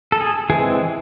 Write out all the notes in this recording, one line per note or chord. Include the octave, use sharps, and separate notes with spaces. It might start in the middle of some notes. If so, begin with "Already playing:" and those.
A4
G#4
E3 G#3 C4 G#4